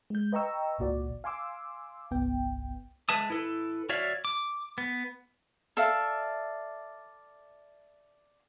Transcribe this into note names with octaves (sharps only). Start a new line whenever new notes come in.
G#3 G6
B4 D#5 G5 A#5 C#6 E6
G#1 C#2 A#2 F#4 D5
F5 G#5 C6 D6 E6
G1 C2 B3 G5
G#3 B4 E5 A5 D#6
E4 A4 B4
F#4 C#5 D5 E5 F5
D6
B3
A4 D5 E5 F5